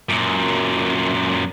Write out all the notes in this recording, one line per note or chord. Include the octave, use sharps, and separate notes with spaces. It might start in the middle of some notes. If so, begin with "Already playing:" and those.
F#2 A#2